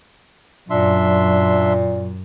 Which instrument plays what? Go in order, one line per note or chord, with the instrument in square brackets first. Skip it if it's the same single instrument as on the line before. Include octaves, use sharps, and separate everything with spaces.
[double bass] F#2 [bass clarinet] A#2 [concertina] D4 E5 C6